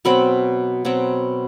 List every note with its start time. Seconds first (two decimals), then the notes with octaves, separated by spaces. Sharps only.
0.05 B2 F#3 C4 B5
0.85 B2 F#3 C4